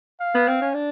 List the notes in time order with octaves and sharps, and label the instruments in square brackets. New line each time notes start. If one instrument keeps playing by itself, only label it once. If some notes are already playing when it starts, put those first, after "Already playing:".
[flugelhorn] F5
[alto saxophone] B3
C4
C#4
D4